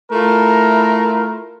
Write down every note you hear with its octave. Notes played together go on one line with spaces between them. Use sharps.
A3 E4 F4 A#4